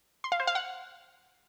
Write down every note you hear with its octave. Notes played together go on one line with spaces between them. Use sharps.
C6
F5
C5
F5
F#5